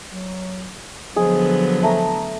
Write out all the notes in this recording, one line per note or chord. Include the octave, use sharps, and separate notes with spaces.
F#3
D3 F3 F#3 G#3 B3 G#4 G#5
A3 A5 A#5